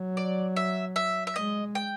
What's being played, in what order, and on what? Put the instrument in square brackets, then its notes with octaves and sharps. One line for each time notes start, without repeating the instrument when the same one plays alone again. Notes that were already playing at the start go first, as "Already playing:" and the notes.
Already playing: [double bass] F#3
[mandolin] D5
E5
E5
E5
[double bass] G#3 [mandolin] D#5
[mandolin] G5